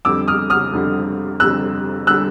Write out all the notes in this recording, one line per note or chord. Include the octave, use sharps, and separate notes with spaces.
F2 D3 G3 D6 E6
D#6 F6
D#6 F6
F2 D3 G3
F2 D3 G3 E6 F#6
D3 G3 E6 F#6